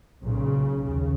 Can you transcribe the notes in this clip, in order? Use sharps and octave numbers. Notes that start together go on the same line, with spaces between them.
B1 A#2 C#3
D#2 C#3